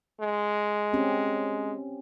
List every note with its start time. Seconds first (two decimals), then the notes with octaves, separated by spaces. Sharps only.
0.21 G#3
0.93 C4 C#4 G4